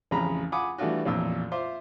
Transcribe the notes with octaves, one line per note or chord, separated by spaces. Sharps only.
A1 F2 C#3 G#4 A#5 B5
F4 F#5 G#5 B5 D6 D#6
E3 G3 A3 D4 F4 F#4
A1 F2 A#2 E6
F4 C5 E5 C6 D6